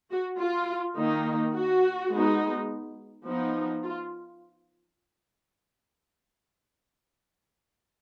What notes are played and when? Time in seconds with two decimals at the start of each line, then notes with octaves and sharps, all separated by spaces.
0.11 F#4
0.39 F4
0.96 D#3 A#3 D#4
1.53 F#4
2.11 G#3 B3 D#4
3.25 F3 B3 D#4
3.83 F4